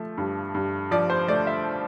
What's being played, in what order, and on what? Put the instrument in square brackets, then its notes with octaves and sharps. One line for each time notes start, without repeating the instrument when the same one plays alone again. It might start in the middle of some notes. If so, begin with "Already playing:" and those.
Already playing: [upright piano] F3 A3
G2
G2
F3 D5
C5
A3 D5
E5